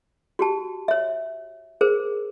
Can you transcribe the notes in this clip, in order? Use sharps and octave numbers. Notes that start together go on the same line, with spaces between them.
F#4 G4 A5
C#5 E5
G#4 A#4 C5